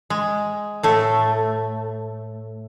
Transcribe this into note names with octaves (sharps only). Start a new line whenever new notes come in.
G#3
A2 A3